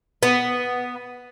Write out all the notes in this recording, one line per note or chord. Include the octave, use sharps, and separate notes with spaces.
B3